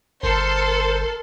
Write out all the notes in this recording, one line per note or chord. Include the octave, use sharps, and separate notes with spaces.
G1 A4 A#4 C5 C6